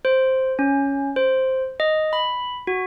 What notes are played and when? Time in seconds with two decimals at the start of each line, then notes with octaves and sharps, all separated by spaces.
0.05 C5
0.59 C#4
1.16 C5
1.80 D#5
2.13 B5
2.67 F#4